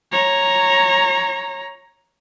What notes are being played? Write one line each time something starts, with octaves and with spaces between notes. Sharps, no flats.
C#5 A#5